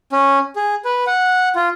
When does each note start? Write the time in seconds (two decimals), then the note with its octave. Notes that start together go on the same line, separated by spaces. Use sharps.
0.12 C#4
0.56 G#4
0.85 B4
1.07 F#5
1.56 F4